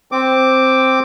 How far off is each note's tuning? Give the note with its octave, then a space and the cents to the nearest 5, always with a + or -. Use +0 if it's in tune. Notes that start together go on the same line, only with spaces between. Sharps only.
C4 +0 D6 +0